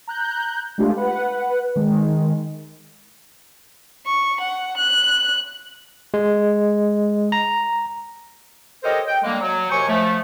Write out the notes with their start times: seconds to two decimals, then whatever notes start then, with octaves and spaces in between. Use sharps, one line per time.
0.08 A#5 F#6 G6
0.78 G#3 A3 D4 F4 G4
0.97 B4 F#5
1.76 D#3 G#3
4.07 C#6
4.41 F#5
4.77 F#6
6.14 G#3
7.32 A#5
8.83 G4 A4 A#4 C5 C#5 D#5
9.07 G5
9.23 D3 G3 G#3 A#3
9.40 F#3
9.70 D#2 C3 C5 C#5 G#5 C#6
9.88 F3 A3